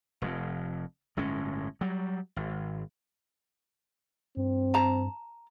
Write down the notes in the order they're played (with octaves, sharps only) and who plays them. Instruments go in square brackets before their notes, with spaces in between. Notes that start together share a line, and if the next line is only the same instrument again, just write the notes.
[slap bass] F1 F2
G1 A2 G#3 C#4
F#3 G3
G#1
[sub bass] G2 [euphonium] C4
[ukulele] A5 A#5